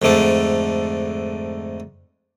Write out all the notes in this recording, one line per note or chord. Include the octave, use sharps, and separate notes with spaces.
F2 G#2 D3 A3 D4